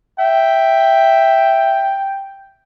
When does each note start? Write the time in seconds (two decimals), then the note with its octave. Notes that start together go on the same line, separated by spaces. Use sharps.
0.19 E5 G5